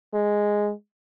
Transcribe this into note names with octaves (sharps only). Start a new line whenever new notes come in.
G#3